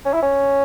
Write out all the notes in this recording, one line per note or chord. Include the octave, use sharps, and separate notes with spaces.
C#4
E4
C#4